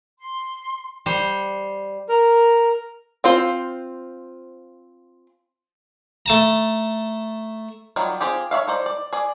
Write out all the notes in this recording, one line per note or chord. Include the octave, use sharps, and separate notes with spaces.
C6
G3 C5
A#4
C4 F4 C5
A3 A5 A#5
D#3 F#3 G3 F4
C4 F4 G4 G#4
C#5 D5 E5 F5
D#4 C5 D5
D5
G#4 D5